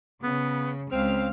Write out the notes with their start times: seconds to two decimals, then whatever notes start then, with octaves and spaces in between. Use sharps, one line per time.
0.23 C#3 B3
0.92 C#2 C4 F5 F6